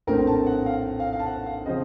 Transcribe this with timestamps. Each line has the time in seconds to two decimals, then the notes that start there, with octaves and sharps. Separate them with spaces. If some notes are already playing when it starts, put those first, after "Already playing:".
0.07 A#1 A2 A3 C4 A#4
0.27 A5
0.47 F#5
0.66 F5
1.00 F5
1.13 F5
1.19 A5
1.26 F#5
1.46 F5
1.66 C#3 F3 C4 D#5